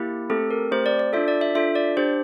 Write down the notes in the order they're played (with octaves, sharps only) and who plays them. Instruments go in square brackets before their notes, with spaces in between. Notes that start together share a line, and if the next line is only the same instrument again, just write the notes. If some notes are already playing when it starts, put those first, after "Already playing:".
Already playing: [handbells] A#3 E4 G4
A3 C4 G4 A4
A#4
A3 C4 G4 C5
D5
D5
D4 F4 A4 E5
D5
E5
D4 F4 A4 E5
D5
D4 G4 C5